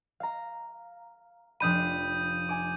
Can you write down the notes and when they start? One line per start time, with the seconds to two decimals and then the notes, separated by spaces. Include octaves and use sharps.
0.20 F5 A#5
1.60 F1 D4 B5 D#6 G6 D#7
2.49 G#5 D6